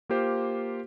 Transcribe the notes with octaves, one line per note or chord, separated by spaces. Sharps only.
A#3 F4 G4 C5